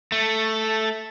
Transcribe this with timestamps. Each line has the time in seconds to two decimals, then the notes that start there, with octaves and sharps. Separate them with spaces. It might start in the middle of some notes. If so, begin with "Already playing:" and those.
0.12 A3